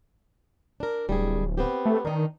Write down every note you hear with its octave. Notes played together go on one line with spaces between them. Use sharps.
D4 A#4
D1 G3 G#4
B3 C4 G4
A3
D#3 D4 D#4